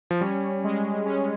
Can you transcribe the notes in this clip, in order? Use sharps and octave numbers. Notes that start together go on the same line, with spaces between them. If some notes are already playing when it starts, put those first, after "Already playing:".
F3
G3 C#4
G#3
C#4